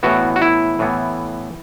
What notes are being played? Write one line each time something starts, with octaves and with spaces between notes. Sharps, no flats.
A2 E3 B3 F#4
F#4
E4
A2 E3 B3